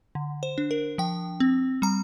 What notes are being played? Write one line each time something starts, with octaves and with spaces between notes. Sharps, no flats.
D3
C5
D4
A#4
F3 G5
C4
G3 A#5